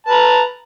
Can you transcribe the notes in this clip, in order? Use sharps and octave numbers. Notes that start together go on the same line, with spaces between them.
B4 A5 A#5